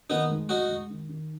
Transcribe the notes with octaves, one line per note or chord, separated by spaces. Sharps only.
D#3 B3 D#4
G#3
G#3 D#4 F#4
G#3
D#3
D#3